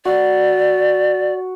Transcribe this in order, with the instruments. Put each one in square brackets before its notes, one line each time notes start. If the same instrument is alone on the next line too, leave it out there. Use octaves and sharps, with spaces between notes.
[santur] F#4 [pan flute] D5